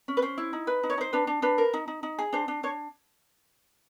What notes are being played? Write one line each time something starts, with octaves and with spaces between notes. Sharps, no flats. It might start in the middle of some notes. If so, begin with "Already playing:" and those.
C#4
B4
C#4 C5
E4
D#4
B4
D#4
C#5
D#4 C5
D4 B4
D4
D4 B4
A#4
D#4
D#4
D#4
G#4
D4 C5
D4
D4 C#5